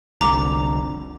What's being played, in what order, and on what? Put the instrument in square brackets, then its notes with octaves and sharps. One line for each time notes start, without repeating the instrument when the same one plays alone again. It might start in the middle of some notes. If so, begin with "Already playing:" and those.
[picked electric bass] F1 C2 D3 [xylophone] A#5 D6